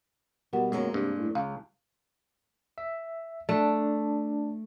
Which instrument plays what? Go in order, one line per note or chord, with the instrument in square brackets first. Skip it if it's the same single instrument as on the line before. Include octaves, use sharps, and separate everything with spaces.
[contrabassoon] B2 [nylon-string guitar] G3 [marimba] A#4 F#5
[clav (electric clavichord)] F#2 F#3 [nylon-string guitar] G#3 A#3
[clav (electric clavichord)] G2 [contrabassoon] C3
[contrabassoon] A2
[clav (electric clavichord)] C#2 [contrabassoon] C#3 [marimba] F5
[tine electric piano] E5
[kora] A3 [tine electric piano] D4